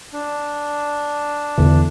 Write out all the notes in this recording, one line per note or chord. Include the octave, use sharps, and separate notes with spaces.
D4
E2 D3 E3